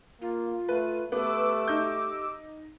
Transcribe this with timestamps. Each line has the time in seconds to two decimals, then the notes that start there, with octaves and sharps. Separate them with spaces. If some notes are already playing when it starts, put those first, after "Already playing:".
0.21 A#3 F4
0.69 A3 B4
1.12 A3 B3 G4 D6 E6
1.68 D#4 G6